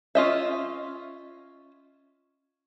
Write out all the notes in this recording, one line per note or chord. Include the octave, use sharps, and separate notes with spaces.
C#4 F4 D#5 E5